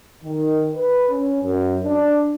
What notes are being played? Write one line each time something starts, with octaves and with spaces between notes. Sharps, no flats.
D#3
B4
C#4
F#2
D4